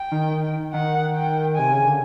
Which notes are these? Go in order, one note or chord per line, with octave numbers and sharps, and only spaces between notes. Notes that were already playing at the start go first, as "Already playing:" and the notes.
Already playing: G5
D#3
D#3 F#5
G5
C3 G#5
C#3
D3